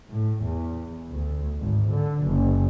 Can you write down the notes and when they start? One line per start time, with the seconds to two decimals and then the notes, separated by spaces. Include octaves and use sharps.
0.11 A2
0.44 E2
1.09 D2
1.60 G#1
1.91 D3
2.27 F#1